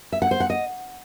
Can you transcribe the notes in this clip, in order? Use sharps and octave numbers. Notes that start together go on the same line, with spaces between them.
E5
F#5
C5
F#5
D#5